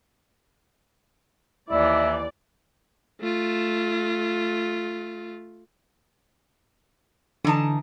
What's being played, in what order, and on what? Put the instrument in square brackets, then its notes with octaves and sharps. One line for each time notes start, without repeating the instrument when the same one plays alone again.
[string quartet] D#2 E3 [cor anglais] E4 [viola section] D5
[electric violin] A3 F4
[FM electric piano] D3 [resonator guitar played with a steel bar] E3 D#4 A5